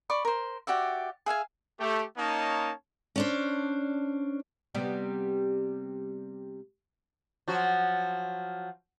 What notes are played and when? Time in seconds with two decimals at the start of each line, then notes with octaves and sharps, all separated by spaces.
0.10 D5 B5 C#6
0.25 A#4 C5
0.67 F#4 G4 D5 E5
1.26 G#4 E5 F5 G#5
1.79 A3 G4
2.17 A#3 C#4 D#4 C#5 D#5 A5
3.16 C#4 D4 C5
4.74 C3 G3 B3
7.48 F3 F#3 F#4